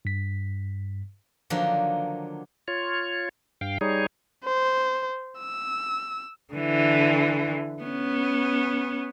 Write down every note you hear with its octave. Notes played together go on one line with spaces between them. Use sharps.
G2 B6
D3 D#3 F3 F#3 A#3
F4 C#5
G2 F5 G5
G3 D#4 G#4 C#5
C5
E6
D3 E3
B3 C#4